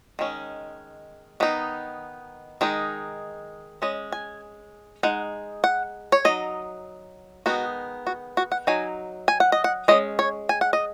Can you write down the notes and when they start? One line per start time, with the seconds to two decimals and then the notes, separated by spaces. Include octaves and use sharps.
0.19 D#3 G#3 C#4
1.40 D#3 B3 D#4
2.61 D#3 G#3 D#4
3.82 G#3 C#4 D#5
4.12 G#5
5.03 G#3 D#4 F#5
5.64 F#5
6.12 C#5
6.25 F#3 D#4 D#5
7.46 D#3 G#3 B3 D#4 F#4
8.07 F#4
8.37 F#4
8.52 F#5
8.67 F#3 D#4 G#5
9.28 G#5
9.40 F#5
9.52 D#5
9.64 F#5
9.88 G#3 C#4 D#5
10.19 C#5
10.49 G#5
10.61 F#5
10.73 D#5